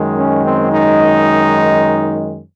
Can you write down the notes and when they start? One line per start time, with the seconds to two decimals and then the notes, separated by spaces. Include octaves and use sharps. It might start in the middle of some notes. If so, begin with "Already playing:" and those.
Already playing: F#2 D#3 G#3
0.16 C#4
0.45 C4
0.72 D#4